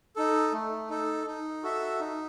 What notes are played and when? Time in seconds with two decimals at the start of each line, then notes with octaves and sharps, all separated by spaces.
0.16 D#4 A4
0.52 A3
0.90 D#4 A4
1.27 D#4
1.63 F#4 A4 E5
2.00 D#4